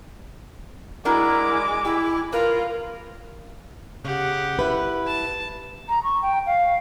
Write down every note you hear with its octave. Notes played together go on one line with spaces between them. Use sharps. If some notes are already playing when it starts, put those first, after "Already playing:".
G#3 D4 E4 F#4 A#4 D6
E4 G4
F4 A#4 B4
C#3 G4 F#5
E4 B4
A5
A#5
C#6
G5
F5